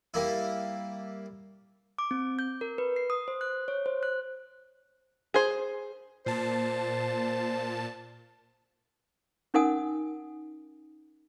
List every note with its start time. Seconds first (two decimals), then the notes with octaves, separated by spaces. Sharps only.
0.14 G3 A#3 E4
1.98 D6
2.11 C4
2.39 G6
2.61 A#4
2.78 B4
2.96 C7
3.10 D#6
3.28 C5
3.41 F#6
3.68 C#5
3.86 C5
4.03 F#6
5.34 G#4 C5
6.26 A#2 C5 A5
9.54 C#4 D#4 A#4 F#5 G#5 D#6